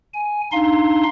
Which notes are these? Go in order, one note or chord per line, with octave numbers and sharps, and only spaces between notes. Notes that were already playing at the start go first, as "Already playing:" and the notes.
G#5
D4 D#4 F5 C6